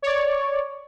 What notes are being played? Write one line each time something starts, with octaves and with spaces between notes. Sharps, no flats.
C#5 D5